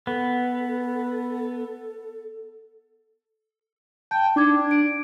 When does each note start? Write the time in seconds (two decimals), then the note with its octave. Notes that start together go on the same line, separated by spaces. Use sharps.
0.07 B3 A4
4.11 G5 A5
4.36 D4 D#4 D6 G#6
4.71 D7